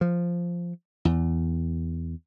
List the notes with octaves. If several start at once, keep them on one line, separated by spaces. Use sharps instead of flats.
F3
E2